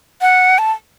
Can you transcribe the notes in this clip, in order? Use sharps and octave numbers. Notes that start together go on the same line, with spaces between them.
F#5
A5